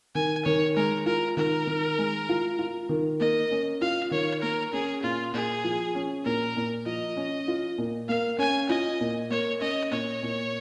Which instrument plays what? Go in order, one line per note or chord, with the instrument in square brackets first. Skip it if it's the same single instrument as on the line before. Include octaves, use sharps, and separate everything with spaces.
[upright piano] D#3 [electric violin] G#5
[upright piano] D#3 [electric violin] C#5
[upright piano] G#3 [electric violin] A#4
[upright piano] F4 [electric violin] A#4
[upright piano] D#3 [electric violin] A#4
[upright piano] D#3
G#3
F4
F4
D#3
[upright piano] A#3 [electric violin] D#5
[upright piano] C#4
[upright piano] F4 [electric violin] F5
[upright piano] D#3 [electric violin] C#5
[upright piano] A#3 [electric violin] A#4
[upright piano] C#4 [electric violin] G#4
[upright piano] A#2 [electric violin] F4
[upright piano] A#2 [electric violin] G#4
[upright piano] F3
C#4
[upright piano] A#2 [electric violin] A#4
[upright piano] A#2
[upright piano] F3 [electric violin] D#5
[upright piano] C#4
F4
A#2
[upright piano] A#3 [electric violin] F5
[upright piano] C#4 [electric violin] G#5
[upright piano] F4 [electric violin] D#5
[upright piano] A#2
[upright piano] A#3 [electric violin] C#5
[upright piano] C#4 [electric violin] D#5
[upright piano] A#2 [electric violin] C#5
[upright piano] A#2